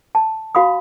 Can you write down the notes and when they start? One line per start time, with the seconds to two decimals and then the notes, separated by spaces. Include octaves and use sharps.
0.15 A5
0.55 F#4 F5 B5 D#6